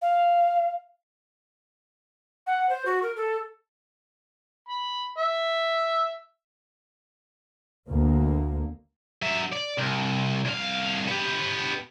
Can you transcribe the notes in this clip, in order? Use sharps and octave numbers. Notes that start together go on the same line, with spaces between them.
F5
F#5
C5
F#4
A#4
A4
B5
E5
D2 A#3
F#3 E5
D5
C2
C2 F5
B3 G4